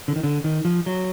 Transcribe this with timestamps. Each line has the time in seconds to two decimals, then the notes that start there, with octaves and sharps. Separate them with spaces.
0.08 D3
0.16 D#3
0.23 D3
0.44 D#3
0.65 F3
0.86 F#3